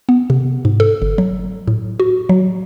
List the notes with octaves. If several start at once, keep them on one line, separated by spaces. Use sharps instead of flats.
B3
C3
G#2
A4
G1
F#3
A2
F#4
F#3